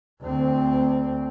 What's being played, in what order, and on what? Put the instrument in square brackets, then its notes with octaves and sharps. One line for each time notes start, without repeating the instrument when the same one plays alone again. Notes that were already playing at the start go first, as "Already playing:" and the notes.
[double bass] D2 C4